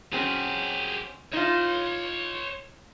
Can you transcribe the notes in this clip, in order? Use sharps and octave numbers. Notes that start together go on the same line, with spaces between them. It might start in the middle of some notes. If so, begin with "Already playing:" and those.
F#3 C4 C#4 G4 G#4
D#4 F4 C#5 C6